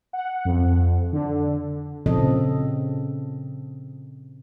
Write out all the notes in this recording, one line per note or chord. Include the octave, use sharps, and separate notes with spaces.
F#5
F2
D3
A#2 C#3 F3 C4 A4 D#5